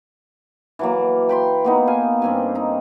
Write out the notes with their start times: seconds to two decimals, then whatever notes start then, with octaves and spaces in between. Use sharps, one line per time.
0.79 E3 F#3 A#3
1.29 G5 B5 C6
1.65 A#3 B3 D#4
1.87 F5 G#5
2.22 G2 C4 G#5
2.55 D#4